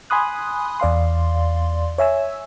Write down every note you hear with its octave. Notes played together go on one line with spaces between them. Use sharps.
G#5 B5 C6 D#6 F#6
E2 D5 F5 C6
C#5 E5 G#5 E6